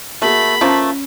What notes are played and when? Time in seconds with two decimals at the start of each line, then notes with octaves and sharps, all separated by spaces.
0.22 A3 A#3 F#4 G#4 B5
0.61 F3 A3 A#3 C#4